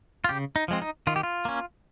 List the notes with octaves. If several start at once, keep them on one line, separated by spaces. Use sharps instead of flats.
F4
C#3 G4
D#4
F3 G#3 C4
D#4
D#3 F4
G4
F4
A#3 C#4